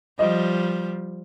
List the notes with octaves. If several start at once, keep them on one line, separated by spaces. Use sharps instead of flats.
F3 G3 D#5